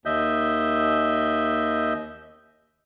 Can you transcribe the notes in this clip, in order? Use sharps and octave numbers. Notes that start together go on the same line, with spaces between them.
D#2 D#5 E5 G6